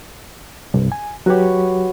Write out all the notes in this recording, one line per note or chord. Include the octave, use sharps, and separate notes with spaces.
C2 G2
G#5
F#3 F#4 G4 B4 C#5